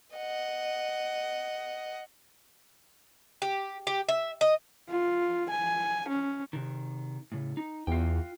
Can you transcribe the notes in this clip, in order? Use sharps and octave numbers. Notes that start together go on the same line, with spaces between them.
D#5 F#5
G4
G4
E5
D#5
F4
G#5
C#4
C3 D#3
A2 C#3
D#4
E2 F4 G5